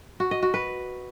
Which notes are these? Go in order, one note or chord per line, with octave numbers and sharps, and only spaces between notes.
F#4
D#5
F#4
B4